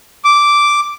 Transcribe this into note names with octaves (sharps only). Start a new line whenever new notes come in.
D6